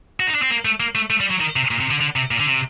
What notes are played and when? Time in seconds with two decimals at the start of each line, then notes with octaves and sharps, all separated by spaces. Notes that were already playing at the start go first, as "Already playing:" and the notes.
0.20 F#4
0.27 D#4
0.35 D4
0.42 C4
0.51 A#3
0.65 A3
0.80 A#3
0.95 A3
1.10 A3
1.20 G3
1.31 F#3
1.40 D#3
1.56 C3
1.71 A#2
1.80 C3
1.91 D3
2.01 D3
2.16 C3
2.31 A#2
2.40 D3
2.46 C3